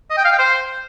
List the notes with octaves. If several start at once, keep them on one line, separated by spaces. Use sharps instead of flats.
D#5
G5
F5
G5
C5